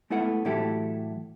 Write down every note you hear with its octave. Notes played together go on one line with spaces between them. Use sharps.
G#3 A3 B3 E4 A4 F#5
A2 E3 F#3 E4 G4 A4